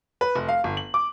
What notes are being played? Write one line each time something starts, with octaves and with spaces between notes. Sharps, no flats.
B4
F1
F5
G1
F#7
D6